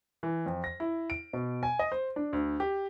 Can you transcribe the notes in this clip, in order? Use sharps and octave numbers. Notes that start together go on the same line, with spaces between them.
E3
F2
A#6
E4
D7
B2
G#5
D#5
C5
D4
D2
G4